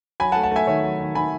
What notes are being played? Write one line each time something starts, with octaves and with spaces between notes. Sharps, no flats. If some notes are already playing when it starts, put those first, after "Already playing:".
F#3 G#5 B5
F#5 A5
A3
F#5 A5
A3 E5 G#5
D#3 C#5 E5
F#3
D#3
D#3 G#5 B5